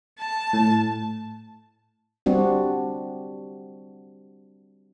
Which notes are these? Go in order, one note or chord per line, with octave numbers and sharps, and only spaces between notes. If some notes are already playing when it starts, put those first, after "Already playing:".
A5
A2
G3 C4 D4 F#4